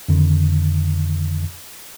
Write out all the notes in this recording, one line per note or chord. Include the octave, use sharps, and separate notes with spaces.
F2 D3 D#3